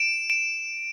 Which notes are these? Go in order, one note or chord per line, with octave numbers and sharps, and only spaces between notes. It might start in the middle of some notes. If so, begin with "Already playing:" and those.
Already playing: D7 E7
D7 E7